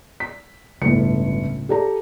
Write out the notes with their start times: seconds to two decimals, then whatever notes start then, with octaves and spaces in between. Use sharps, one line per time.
0.20 B6
0.82 G1 C#2 A2 C#7
1.69 G4 A4 A#5